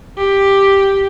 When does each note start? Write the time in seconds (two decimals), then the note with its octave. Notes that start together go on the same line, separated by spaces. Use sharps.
0.18 G4